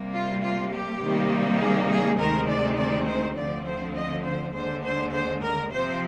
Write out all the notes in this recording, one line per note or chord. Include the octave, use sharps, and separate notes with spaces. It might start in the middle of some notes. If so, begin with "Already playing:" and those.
Already playing: C3 G3 A#3
F4
F4
G4
C3 D#3 G3 A#3 D#4
G#4
G#4
D2 C3 D#3 G#3 C4 A#4
D5
D5
C5
D2 D3 F3 C4 D5
C5
D#5
C5
D#2 D3 G#3 C5
C5
C5
A#4
C3 F3 C4 C5